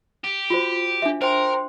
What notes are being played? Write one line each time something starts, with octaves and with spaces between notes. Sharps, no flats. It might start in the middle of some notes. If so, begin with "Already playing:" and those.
G4
F4 F#4 C5
D4 E5
A#4 C5 G5 C6